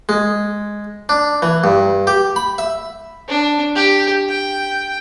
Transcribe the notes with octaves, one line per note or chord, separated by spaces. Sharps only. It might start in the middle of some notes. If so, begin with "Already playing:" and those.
G#3
D4
E3
G2
G4
B5
E5
D4
G4
G5